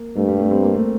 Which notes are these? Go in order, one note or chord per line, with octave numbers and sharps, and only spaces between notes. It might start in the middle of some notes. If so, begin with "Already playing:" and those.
Already playing: A#3
G2 A3
G3
A3
C4
A#3
A3